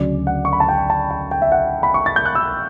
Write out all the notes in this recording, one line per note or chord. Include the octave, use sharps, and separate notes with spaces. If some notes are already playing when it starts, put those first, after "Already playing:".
Already playing: D2 C#3 F#3 C#4 D5
F#5
C#6
B5
A5
G5
A5
G5
G5
E5
F#5
B5
C#6
A6
G6
F#6
E6